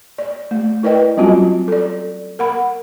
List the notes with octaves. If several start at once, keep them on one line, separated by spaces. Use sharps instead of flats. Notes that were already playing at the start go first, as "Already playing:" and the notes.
D5
A3
E4 A#4 B4 D5 D#5 G5
F#3 G3 C4 C#4 F4 F#4
A4 D5
A#4 F#5 B5